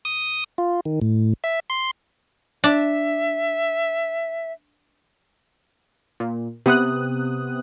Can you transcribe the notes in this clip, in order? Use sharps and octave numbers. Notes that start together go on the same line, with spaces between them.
D#6
F4
D#3
A2
E5
C6
D4 E5
A#2
C3 B3 D#6 F#6